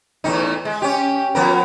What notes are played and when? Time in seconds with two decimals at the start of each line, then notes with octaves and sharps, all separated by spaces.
0.24 E2 A2 D#4
0.65 G#3
0.82 C#4 G4
1.35 F3 B3 A#4